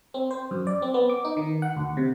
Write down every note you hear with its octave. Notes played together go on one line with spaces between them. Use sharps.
C4
C5
F#2
D5
C4
B3
D6
D#4
D#3
F#5
D2
C3